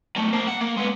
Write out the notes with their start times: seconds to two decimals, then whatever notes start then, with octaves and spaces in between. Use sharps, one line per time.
0.17 F#3 A3
0.33 A#3 C5
0.48 F#5
0.61 A#3
0.77 G#3 B3